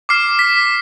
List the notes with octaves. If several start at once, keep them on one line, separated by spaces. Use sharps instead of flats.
D6 F6 C7
B6